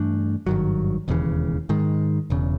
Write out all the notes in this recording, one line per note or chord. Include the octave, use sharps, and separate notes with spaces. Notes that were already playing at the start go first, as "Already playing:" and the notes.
Already playing: G2 E3 A3 D4
G#1 G2 D#3 F#3
E1 D#2 C#3 E3
G#2 D#3 G#3
E1 E2 C#3